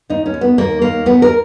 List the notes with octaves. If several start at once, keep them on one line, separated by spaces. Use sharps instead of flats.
D#2 D#4
C#4
D#2
B3
D#2 A#3
D#2 A#3
D#2 B3
A#4